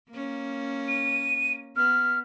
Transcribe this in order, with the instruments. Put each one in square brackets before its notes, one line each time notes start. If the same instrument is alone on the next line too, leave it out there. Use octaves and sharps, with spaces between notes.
[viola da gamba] A#3 C#4
[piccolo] D#7
[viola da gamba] B3 [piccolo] F6